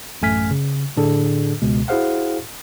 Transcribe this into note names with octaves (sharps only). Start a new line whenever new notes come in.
A1 F#2 A3 G#5 F6 B6
C#3
A2 D3 D4 G#4 A4
C#2 B2 G#3
E4 F#4 G#4 C5 F5 F#5